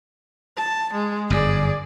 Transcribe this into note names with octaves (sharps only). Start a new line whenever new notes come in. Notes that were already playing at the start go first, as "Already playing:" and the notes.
A5
G#3
G1 F#2 G#4 D5